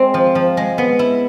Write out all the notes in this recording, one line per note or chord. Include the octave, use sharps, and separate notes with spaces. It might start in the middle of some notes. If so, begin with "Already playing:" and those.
Already playing: G#3 C4
F3
F3
G#3
B3
E4